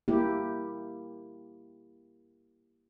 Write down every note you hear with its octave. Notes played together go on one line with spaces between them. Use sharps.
A#3 E4 G4